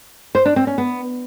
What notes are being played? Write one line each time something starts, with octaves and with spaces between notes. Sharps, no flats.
C5
D4
C4
C#4
B3